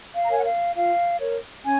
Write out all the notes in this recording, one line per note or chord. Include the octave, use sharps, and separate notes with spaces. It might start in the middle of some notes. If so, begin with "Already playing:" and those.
F5
A#5
A#4 C#5 G#5
F#5
F5
F4 F5
A#4 C#5
C#4 G#5